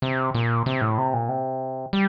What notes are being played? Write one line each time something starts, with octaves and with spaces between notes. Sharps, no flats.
C3
A#2
C3
A2
C3
A#2
C3
G3